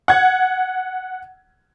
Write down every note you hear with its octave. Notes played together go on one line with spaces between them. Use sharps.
F#5 G#6